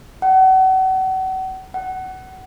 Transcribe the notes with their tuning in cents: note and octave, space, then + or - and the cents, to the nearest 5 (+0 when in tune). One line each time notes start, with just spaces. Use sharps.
F#5 +35
F#5 +20